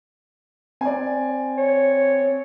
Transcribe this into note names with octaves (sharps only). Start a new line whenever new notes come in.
C4 D5 G#5
C#5